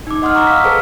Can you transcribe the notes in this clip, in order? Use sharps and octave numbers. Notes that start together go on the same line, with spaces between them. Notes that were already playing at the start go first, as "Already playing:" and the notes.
D#4 D6
D#5 F#5 C6 D#6 F6
A#5 C#6 D6 E6
F5 E6 F6 B6
G#4 A4 B4 C5 A5